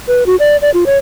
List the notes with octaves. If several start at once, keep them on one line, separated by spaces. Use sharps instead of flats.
B4
F#4
D5
D5
F4
C#5